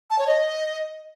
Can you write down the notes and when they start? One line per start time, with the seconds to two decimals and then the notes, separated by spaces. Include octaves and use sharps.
0.10 A5
0.19 C#5
0.27 D#5